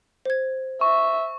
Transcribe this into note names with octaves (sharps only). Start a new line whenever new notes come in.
C5 G#6
E5 C#6